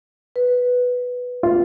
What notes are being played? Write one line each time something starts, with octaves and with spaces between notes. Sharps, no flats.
B4
F4